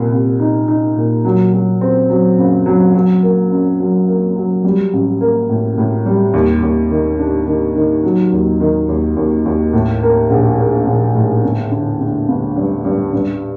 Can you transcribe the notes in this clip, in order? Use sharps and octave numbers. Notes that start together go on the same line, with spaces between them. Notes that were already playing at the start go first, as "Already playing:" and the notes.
Already playing: C2 A#2
C2
D#4
D#4
A#2
F#3
F#3
C4
F#3
F#1
F#3
F#3
A#3
F#2
F#3
A#3
F#3
G3
A1
A#3
A2
A2
G3
D#2
D#2
D#3
D4
D#3
D#3
F#3
D#2
D#3
D#2
D#2
D#2
A2
A#3
A#1
A#3
A#1
A2
G1
D3
D3
G1
G2
G2
G2